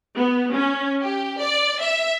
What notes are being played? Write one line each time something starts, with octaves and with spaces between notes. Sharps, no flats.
B3
C#4
G4
D5
E5